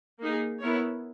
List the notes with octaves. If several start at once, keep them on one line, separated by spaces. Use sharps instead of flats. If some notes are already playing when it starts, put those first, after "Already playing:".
A#3 D#4 G#4
B3 E4 A#4 C#5